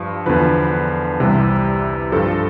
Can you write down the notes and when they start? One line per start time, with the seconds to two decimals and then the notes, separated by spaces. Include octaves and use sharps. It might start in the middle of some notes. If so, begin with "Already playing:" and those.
Already playing: G2 F3
0.26 E2 D3 F3 B4
1.19 C2 C3 E3 G3
2.12 G2 F3 A4